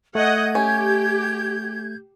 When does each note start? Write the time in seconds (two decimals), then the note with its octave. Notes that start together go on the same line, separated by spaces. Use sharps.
0.15 A3 D#5 F#5 G6 G#6
0.55 C#4 G4